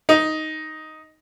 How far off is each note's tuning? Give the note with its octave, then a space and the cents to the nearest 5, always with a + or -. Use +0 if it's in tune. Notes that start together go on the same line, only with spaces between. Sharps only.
D#4 +5